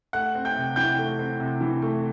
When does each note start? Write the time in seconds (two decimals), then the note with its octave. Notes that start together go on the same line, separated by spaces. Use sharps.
0.13 A3 F#5 F#6
0.35 C4
0.45 G5 G6
0.56 C3
0.76 E3 G5 G6
0.98 A3
1.19 C4
1.40 C3
1.61 E3
1.82 A3